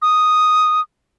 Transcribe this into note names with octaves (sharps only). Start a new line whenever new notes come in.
D#6